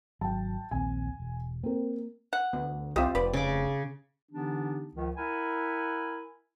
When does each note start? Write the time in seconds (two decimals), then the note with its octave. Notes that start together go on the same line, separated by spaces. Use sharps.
0.21 G#1 F#3 G5 A5
0.71 A#1 D#2 C4 G#5
1.20 E1
1.63 A#3 C4 A#4
2.33 F#5
2.53 D2 B3
2.96 C2 C4 F4 G4 D#5 E5
3.15 F1 B4 D5
3.33 C#3 G#4 D6
4.31 D3 E3 B3 D4 D#4 G4
4.94 C#2 D#3 F3
5.17 E4 A#4 F#5 G#5 B5